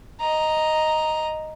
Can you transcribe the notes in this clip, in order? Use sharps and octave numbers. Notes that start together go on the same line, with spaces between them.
D#5 A#5